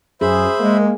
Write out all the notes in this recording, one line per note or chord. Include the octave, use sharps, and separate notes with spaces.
F#2 G#4 C5 E5 B5
G#3 A#3